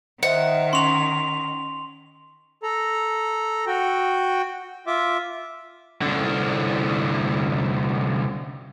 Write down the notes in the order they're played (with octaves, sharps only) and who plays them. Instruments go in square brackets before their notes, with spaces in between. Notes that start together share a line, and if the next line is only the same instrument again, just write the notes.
[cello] D#3 [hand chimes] C5 D#5 E5 [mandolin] F#5
[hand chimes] C#4 C#6 [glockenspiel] C6 F7
[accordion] A4 A#5
F#4 G5
F4 E5 D6
[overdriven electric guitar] C2 D3